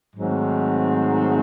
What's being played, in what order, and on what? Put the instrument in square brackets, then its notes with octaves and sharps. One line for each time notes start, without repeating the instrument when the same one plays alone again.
[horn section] G#2 D#3 F#3 A3 C4